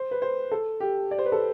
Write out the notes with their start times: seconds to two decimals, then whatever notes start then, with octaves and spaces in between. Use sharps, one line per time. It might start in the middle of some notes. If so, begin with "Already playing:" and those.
Already playing: C5
0.11 B4
0.22 C5
0.52 A4
0.80 G4
1.11 D5
1.18 C5
1.26 B4
1.32 A4